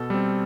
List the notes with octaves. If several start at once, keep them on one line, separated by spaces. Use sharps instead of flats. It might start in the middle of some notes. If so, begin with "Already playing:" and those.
Already playing: B2 A4
G3 C4